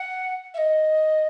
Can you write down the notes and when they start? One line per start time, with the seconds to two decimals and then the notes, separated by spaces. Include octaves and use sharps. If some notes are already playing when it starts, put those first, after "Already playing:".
Already playing: F#5
0.54 E5
0.58 D#5